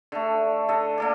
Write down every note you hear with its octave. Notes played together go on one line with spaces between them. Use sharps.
D3 A3
D3 A4 D#5
A#3 A4 D5